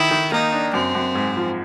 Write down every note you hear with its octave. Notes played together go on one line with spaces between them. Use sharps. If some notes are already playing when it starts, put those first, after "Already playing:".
Already playing: D#3 E4
D#3
A#3 D#4
D4
F#2 C4
F#2
G#2
F3